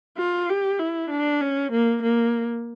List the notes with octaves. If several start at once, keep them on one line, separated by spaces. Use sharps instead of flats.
F4
G4
E4
D4
C#4
A#3
A#3